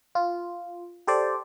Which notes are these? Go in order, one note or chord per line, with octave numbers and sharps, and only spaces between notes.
F4
G4 A4 C5 D5